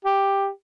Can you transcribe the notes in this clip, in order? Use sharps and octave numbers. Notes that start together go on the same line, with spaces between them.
G4